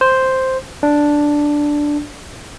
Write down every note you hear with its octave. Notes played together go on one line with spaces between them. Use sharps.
C5
D4